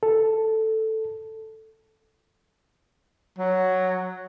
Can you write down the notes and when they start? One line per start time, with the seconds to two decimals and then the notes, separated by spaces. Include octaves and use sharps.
0.03 A4
3.38 F#3